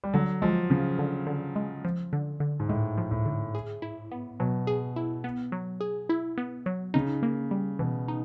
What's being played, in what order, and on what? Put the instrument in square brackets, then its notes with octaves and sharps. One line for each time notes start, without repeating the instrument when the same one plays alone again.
[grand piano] G3
[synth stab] D3 [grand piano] F#3
[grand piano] F3 [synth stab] G#3
[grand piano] C#3 [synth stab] F3
[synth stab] D3
D3
G#3
F3
D3
D3
[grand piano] G#2
[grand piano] A2 [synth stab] G#3
[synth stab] F3
[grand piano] A2
[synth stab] D3
G#4
E4
B3
[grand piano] B2 [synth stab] F#3
[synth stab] G#4
E4
B3
F#3
G#4
E4
B3
F#3
[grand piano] C#3 [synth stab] D#4
[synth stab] A#3
G3
[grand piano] B2 [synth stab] E3
[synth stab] D#4